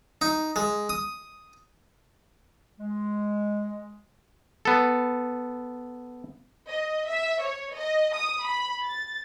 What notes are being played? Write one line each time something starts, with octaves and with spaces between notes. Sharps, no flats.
D#4
G#3
D#6
G#3
B3 A4
D#5
E5
C#5
D#5
D#6
B5
A6